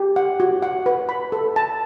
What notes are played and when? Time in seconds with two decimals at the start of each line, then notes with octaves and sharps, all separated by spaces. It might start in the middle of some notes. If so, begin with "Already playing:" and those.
Already playing: G4
0.16 F#5
0.40 F#4
0.62 F#5
0.86 B4
1.09 B5
1.32 A4
1.56 A5